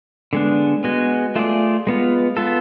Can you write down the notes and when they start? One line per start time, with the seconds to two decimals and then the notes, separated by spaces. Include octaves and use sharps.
0.33 D3 G#3 B3 D4
0.84 G#3 B3 F#4
1.36 A3 F4 G#4 D5
1.87 G#3 B3 F4
2.37 B3 F4 A4